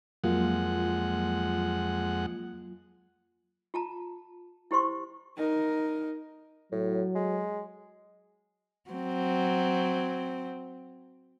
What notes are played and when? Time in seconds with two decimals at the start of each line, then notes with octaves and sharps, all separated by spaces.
0.24 F2 F#3 G#3 A#3 F4 F#5
3.74 F4 A5 A#5
4.71 E4 G4 C5 C6 C#6
5.37 D#4 A#4
6.72 A2 F#3
7.15 G#3
8.90 F#3 C4